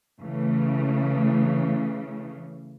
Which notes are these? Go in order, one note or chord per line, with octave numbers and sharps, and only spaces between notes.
C#3 E3 A3